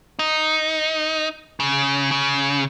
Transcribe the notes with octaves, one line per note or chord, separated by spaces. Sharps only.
D#4
C#3
C#3